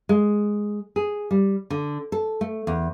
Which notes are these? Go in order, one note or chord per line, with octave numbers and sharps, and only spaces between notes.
G#3
G#4
G3
D3
A4
A3
E2